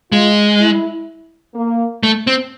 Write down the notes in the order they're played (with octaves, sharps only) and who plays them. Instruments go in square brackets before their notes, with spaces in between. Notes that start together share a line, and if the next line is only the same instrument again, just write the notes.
[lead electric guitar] G#3 [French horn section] F4
[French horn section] E4
A#3
[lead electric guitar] A3
C4